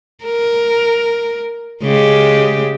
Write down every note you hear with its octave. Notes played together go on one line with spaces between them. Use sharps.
A#4
C#3 G#3 G4